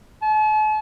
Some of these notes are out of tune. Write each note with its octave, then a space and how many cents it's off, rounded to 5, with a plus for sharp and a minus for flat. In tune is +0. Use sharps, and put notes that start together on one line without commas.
A5 -45